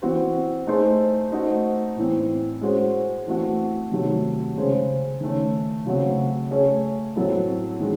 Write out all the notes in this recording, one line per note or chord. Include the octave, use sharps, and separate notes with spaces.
E3 C4 F#4 C5
A3 D#4 G#4 C5
A3 D#4 F#4 C5
A2 E3 C4
G#3 C#4 F#4 C5
E3 A3 C4 F#4
C3 D#3 F#3 A3
C#3 G#3 C#4 G#4 C5
D#3 A3 C#4
C#3 F#3 A3 C4 F#4
A3 C#4 G#4 C#5
A2 F#3 C4 E4 A4
D#3 G#3